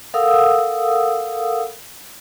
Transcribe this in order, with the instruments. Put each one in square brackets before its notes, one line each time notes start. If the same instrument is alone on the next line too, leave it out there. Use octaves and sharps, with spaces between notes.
[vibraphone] A4 A#4 F5 F#5 D#6 E6